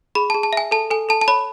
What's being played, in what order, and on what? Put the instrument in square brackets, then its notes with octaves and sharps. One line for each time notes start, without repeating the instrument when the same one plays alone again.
[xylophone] G#4 B5
A5
G#4
A5
E5 G#5
A4 A5
A4 G#5
A4 A5
A5
C#5 B5